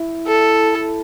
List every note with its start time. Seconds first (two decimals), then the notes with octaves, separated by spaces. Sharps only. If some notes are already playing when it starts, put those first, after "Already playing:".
Already playing: E4
0.27 A4